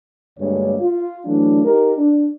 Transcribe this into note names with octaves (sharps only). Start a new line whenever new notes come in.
D2 G2 G#3 A#3 C#5
F4
E3 F#3 A3 D4
D#4 G4 A#4
D4